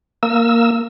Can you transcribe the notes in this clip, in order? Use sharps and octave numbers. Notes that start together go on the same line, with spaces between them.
A#3 E6